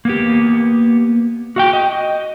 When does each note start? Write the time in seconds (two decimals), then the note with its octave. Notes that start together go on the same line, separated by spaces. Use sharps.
0.05 A#3 B3 G4
1.56 F#4 F5 G5
1.73 D#5